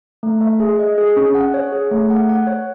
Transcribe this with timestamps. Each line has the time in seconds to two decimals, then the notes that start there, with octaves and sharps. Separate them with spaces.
0.23 A3
0.41 E5
0.60 G#4
0.79 D#5
0.98 G#4
1.17 C#4
1.35 F#5
1.54 C#5
1.72 G#4
1.91 A3
2.10 F#5
2.29 F#5
2.47 C#5